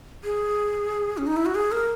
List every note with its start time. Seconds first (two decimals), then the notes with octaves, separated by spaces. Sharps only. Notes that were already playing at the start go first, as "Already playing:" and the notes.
0.24 G#4
1.18 C#4
1.27 D#4
1.36 E4
1.46 F#4
1.55 G#4
1.72 A#4